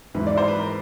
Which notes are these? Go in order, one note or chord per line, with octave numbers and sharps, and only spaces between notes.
G#2 E3 B4
D5
C5
B4
A#4